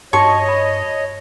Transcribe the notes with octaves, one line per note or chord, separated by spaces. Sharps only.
G2 D#4 F#4 C#5 D#5 A5 C#6
B5